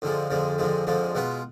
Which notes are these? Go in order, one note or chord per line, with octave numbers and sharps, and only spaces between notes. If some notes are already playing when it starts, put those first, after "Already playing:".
F2 D3 F3 G#3
F2 D3 F3 G#3
F2 D3 F3 G#3
F2 D3 F3 G#3
B2 G#3 B3 F4